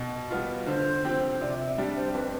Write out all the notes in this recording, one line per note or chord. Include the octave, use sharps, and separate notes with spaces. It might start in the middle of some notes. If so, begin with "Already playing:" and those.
Already playing: B2
G3 B3 F4
D3 C5
F3 C4 G4
C3 D5
E5
G3 D4 G4 D5
C5
F2 B4